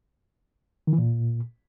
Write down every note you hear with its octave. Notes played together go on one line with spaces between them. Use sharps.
D#3
E3
A#2